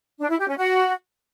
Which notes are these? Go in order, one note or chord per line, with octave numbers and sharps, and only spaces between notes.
D4
E4
G4
C#4
F#4